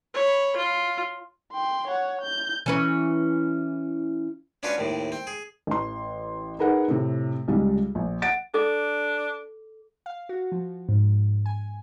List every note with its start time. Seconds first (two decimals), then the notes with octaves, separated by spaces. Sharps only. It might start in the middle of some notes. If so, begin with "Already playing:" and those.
0.14 C#5 B5
0.56 F4
1.53 G5 C6
1.88 C#5 F#5
2.21 G6
2.66 E3 C#4 B4
4.63 C#4 D4 F4 F#4 B4 C#5
4.78 D#2 A2 C3
5.12 C4
5.27 G#4
5.67 A1 C6
6.59 D#4 G#4 A#4 B4 F#5
6.88 A2 C3
7.48 C#2 G3 G#3
7.95 A#1
8.22 F#5 A6 D7
8.54 D4 A4 D6
10.06 F5
10.29 F#4
10.52 F3
10.89 G#2
11.46 G#5